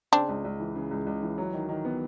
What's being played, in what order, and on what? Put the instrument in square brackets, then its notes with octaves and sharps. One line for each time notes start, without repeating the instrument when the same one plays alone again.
[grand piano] C#3 [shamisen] C4 D4
[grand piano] C#2
C#2
E3
C#3
C#2
C#2
E3
F#3
D#3
D#3
B3